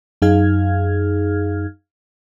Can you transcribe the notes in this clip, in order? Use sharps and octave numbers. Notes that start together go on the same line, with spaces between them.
F#2 D#4 G#4 F5 F6 G#6